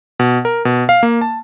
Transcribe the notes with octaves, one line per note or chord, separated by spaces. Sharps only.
B2
A#4
B2
F5
A#3
A5